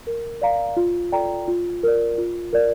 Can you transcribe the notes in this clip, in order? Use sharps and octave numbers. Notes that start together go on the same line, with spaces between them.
A#4
D5 F5 A#5
F4
A4 D5 G5 A#5
F4
A#4 D5
F4
A#4 D5